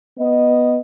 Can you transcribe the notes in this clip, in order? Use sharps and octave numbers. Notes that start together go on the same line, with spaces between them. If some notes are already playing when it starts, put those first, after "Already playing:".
B3 D#5